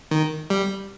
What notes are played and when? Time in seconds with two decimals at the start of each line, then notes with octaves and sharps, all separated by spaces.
0.11 D#3
0.50 G3